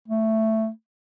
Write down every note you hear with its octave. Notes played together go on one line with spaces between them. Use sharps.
A3